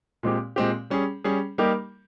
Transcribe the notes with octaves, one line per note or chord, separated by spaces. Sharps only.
A#2 G#3 C4 G4
A#2 G#3 C4 G4
G3 C#4 G#4
G3 C#4 G#4
G3 A#3 D#4 G4 A#4